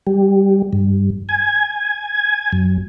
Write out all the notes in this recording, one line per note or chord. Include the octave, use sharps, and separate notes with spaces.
G3
G2
G#5
F#2